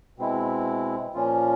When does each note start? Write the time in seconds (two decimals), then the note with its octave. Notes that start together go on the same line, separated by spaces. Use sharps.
0.18 B2 G#3 C4 E4
1.14 A#2 F3 A#3 C#4 F4